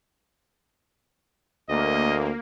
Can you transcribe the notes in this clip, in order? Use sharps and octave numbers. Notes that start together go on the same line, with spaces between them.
D2 A#3 D#5